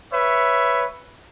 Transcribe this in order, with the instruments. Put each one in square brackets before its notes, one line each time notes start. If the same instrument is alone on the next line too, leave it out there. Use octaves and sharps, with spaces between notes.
[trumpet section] B4 C#5 E5